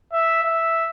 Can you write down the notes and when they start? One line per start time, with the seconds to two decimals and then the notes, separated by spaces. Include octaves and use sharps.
0.12 E5
0.43 E5